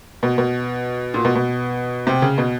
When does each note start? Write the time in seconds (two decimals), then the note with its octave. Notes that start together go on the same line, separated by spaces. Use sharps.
0.23 B2
0.38 B2
1.14 A#2
1.25 B2
1.35 B2
2.07 C3
2.22 C#3
2.38 B2